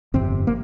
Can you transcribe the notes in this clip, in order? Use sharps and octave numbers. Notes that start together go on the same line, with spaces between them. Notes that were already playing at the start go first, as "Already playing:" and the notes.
G1 F2 C3 C4
A#3